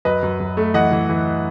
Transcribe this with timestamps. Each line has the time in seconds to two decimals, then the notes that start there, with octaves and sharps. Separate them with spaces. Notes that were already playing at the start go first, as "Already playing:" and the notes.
0.05 F#2 B4 D#5
0.23 F#2
0.40 F#2
0.57 A3
0.74 E3 D#5 F#5
0.91 E3
1.09 E3